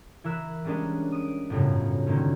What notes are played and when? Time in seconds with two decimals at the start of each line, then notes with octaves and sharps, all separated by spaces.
0.24 E3 E4 A#4 E6 F#6
0.65 G3 G#3 C#4 D4 A#4 D#5
1.12 D#6 D7
1.50 G1 F#2 A2 C#3
2.07 D3 D#3 A#3 C4 C#4